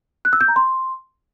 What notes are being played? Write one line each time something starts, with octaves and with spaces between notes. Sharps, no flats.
F#6
E6
G6
A#5
C6